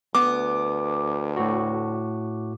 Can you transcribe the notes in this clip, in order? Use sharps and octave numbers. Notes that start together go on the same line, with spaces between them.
D2 B3 D6
A2 F#4